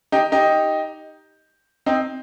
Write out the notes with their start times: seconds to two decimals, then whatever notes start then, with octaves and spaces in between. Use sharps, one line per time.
0.12 D#4 G4
0.32 D#4 G4
1.86 C4 D#4